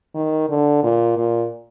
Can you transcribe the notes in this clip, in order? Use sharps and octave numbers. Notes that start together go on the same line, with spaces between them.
D#3
D3
A#2
A#2